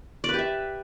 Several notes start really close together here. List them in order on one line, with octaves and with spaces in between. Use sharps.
D5 B4 G4 E5